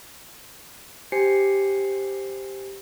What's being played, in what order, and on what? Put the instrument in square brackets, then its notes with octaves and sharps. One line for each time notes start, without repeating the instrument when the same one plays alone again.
[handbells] G4 C5 G#5 C7 C#7